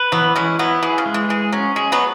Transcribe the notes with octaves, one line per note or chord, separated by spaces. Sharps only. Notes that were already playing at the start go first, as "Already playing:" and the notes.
Already playing: B4
E3 F#3 B3
G#3 C#4 E4
F#3 B3 E4
E3 G#4
C#3
G#3
E3
E3 G#4
F#3 C#4
G#3 G#4
F#3 B3